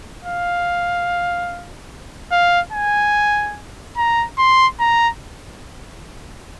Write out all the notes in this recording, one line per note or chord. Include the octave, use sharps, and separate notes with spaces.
F5
F5
G#5
A#5
C6
A#5